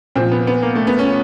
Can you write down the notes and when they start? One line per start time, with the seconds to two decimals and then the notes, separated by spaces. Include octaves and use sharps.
0.16 A#2 F3 C4
0.31 B3
0.47 B3
0.62 A#3
0.75 A3
0.87 B3
0.99 C#4